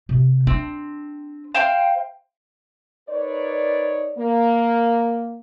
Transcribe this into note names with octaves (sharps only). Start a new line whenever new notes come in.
C3
C4 D4
C5 F5 G5
D#4 A#4 B4 C#5 D5
A#3